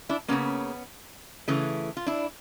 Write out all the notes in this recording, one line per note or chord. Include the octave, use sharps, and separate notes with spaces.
D4 E4
C#3 F#3 A#3 B3 C#4
C#3 E3 A3
F4
D4 E4